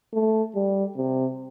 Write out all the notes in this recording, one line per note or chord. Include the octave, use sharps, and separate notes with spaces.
A3
G3
C3